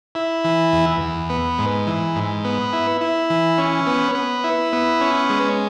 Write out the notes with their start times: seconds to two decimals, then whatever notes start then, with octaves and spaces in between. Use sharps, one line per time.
0.15 E4
0.44 E3
0.73 E2
1.01 E2
1.30 B3
1.58 G#2
1.87 E3
2.16 G#2
2.44 B3
2.73 E4
3.01 E4
3.30 E3
3.58 C#4
3.87 B3
4.15 B3
4.44 E4
4.73 B3
5.01 C#4
5.30 G#3